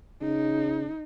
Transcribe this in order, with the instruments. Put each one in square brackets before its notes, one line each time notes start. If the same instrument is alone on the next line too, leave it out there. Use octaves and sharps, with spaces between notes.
[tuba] C#3 [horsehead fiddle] D#4